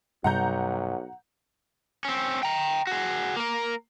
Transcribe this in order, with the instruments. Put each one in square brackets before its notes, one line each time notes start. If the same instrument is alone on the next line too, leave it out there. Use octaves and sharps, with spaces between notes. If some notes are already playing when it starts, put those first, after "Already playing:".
[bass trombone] B1 [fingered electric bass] G2 C3 G3 [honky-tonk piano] F#5 A#5 G6
[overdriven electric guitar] C4 C#4
G5 A#5
F#4 G#4
A#3 A#4